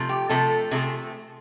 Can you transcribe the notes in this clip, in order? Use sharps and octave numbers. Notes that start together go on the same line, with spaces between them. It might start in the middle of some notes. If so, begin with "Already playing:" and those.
Already playing: C3 F3 A3
G4
C3 F3 A3 A4
C3 F3 A3 G#4